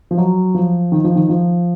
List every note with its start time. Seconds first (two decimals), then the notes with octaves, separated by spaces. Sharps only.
0.11 F3
0.18 F#3
0.55 F3
0.92 D#3
1.04 F3
1.15 D#3
1.29 F3